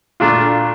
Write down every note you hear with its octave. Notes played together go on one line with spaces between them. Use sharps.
A#2 A3 D4 F4